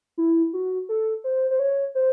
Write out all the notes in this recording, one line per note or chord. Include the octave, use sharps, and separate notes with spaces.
E4
F#4
A4
C5
C5
C#5
C5